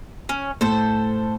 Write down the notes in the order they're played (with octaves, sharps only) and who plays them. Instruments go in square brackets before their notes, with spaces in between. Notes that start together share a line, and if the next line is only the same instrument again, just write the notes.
[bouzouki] C#4
[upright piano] A2 [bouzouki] A4 C5